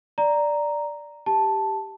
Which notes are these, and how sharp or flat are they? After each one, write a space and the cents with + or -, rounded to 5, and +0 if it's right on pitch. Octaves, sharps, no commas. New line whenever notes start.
D5 +0 A#5 +0
G4 +5 A5 +0